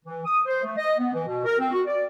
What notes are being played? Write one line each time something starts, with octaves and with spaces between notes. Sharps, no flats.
E3
D#6
C5
A3
D#5
B3
E3
B2
A#4
C4
F#4
D5